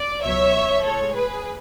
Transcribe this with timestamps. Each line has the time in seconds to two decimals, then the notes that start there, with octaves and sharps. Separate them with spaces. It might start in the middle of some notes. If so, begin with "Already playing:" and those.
Already playing: D5
0.23 C#2 B2 F#3 C#5 E5
0.84 A2 G#3 A4 C#5
1.14 G#4 B4